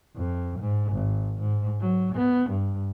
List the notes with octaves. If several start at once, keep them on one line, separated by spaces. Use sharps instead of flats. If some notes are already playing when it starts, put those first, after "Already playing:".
F2
G#2
G#1
G#2
F#3
B3
G2